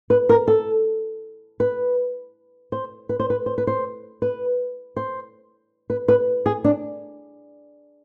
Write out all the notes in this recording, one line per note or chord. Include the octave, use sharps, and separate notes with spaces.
B4
A#4
A4
B4
C5
B4
C5
B4
C5
B4
C5
B4
C5
B4
B4
G#4
D4